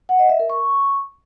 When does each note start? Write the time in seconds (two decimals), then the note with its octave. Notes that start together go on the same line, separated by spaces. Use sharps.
0.09 F#5
0.19 D#5
0.29 E5
0.39 A#4
0.50 C#6